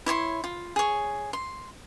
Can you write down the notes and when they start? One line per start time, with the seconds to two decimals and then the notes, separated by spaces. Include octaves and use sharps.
0.06 E4 C#5 G#5 C6
0.44 F4
0.76 G#4 C#5
1.33 C6